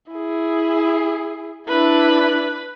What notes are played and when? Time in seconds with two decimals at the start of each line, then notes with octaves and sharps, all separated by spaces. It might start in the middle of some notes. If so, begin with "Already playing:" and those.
0.12 E4 G#4
1.68 D4 E4 B4